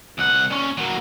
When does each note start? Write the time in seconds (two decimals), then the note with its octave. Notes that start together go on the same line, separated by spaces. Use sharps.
0.18 C2 F#5
0.50 A#2 C#4
0.77 F#3 A#3